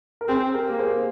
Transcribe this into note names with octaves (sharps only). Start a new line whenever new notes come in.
A#4
C4 G#4 C5
G4 A#4
A#3
G#4 C5